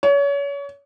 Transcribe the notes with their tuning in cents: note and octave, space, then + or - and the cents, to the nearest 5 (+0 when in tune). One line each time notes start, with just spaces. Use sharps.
C#5 +30